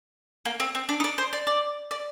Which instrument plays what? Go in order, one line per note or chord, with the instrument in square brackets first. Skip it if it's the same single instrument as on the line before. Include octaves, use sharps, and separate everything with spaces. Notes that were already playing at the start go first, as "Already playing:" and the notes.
[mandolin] A#3
C4
C4
D4
D#4
D4
C5
D5
D5
D5